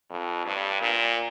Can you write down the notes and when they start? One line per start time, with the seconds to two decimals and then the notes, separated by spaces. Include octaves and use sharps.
0.10 F2
0.46 G2
0.81 A#2